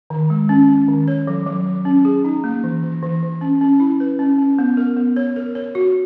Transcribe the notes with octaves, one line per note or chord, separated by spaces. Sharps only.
D#3
G#3
C#4
C#4
D#3
C#5
F#3
F#3
F#3
C#4
G#4
D#4
A#3
E3
E3
E3
E3
C#4
C#4
E4
B4
C#4
C#4
B3
A#4
B3
C#5
A#4
C#5
F#4